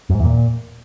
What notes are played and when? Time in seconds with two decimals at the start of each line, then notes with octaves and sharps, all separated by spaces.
0.10 F#2
0.15 G#2
0.20 E2
0.25 A#2